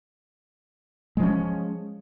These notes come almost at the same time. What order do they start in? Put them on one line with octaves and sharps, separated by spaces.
G#3 F3 C#4